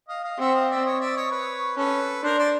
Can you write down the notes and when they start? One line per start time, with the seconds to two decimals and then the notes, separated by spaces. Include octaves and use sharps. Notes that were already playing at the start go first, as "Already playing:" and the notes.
0.08 D#5 F5
0.23 D#5 F5
0.39 C4 E5 F#5
0.54 D#5 F5
0.70 D5 E5
0.85 C#5 D#5
1.00 D5 E5
1.16 C#5 D#5
1.31 B4 C#5
1.77 C#4 A4 B4
2.23 D4 A#4 C5
2.38 C5 D5